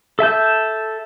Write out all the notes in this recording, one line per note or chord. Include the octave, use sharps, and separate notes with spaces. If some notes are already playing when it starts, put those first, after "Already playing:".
A4 E5 A5 G6